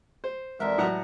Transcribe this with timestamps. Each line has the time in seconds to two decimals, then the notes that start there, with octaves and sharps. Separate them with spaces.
0.24 C5
0.60 F2 E3 G3 G#3 A#4 E5
0.78 A2 F#3 F#4 F#5 A#5